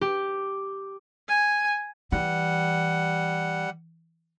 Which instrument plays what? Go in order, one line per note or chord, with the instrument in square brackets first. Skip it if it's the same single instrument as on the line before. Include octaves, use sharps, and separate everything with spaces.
[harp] G4
[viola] G#5
[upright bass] E3 [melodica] G3 F#5